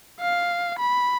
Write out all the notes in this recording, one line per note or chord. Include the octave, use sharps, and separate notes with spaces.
F5
B5